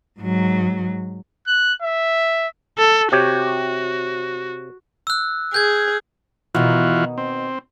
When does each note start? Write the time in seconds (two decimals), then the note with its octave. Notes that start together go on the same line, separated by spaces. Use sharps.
0.20 G#2 F#3
1.47 F#6
1.83 E5
2.78 A4
3.12 C3 F#4 G4 C#5
5.07 E6 F#6
5.54 G#4 G6 G#6
6.55 B2 D#3 E3 F4 F#4
7.18 C4